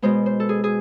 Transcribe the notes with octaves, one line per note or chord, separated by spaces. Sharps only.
B2 G#3 B3 C5
C5
A4
G#4
G#4